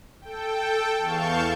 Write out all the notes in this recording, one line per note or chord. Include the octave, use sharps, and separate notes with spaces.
A4 G5
E2 F5 A5 C#6 G6